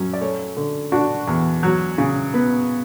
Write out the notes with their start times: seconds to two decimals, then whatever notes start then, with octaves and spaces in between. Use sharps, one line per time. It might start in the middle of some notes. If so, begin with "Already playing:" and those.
Already playing: F#2 C#4
0.13 D5
0.21 A3 C#5
0.57 D3
0.92 D4 F#4
1.27 E2
1.63 F#3
1.98 C#3
2.34 B3